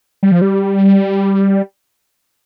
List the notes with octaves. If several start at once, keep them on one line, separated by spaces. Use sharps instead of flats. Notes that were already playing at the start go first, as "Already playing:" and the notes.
G3
F3
G3